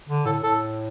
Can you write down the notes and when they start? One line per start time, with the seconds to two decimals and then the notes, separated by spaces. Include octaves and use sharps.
0.09 D3
0.26 A2 A4
0.43 A2 A4